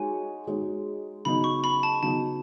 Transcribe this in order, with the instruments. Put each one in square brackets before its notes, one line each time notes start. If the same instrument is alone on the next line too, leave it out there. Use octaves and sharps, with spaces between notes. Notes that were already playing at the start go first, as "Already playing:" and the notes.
Already playing: [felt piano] G#3 D#4 F#4 C#5 [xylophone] G#5
[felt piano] G#3 D#4 F#4 C#5
[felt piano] C#3 F#3 B3 D#4 [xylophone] B5
[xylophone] C#6
B5
A5
[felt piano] C#3 F#3 B3 D#4 [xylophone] A5